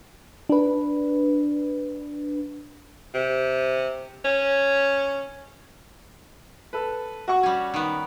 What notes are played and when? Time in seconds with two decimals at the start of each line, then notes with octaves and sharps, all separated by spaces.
0.49 D4 B4
3.14 C3
4.24 C#4
6.73 A4 B4
7.28 F#4 F#5 C#6
7.43 G3 C#4
7.74 D#3 B3